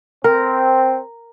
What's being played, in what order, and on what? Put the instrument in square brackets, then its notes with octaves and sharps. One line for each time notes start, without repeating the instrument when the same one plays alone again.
[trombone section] C4 [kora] A#4